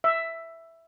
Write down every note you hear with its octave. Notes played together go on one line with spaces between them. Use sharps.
E5